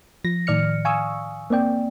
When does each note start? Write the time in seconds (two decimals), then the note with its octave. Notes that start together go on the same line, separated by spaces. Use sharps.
0.24 F3 A#6
0.47 A2 D#3 D5 F6 C#7
0.85 F5 G#5 C#6 D#6 E6
1.50 A#3 C4 D5 G5